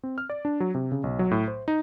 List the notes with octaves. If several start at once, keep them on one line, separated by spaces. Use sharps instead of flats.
C4
F6
D5
D4
F#3
C3
C#3
B1
F#3
A2
C5
D#4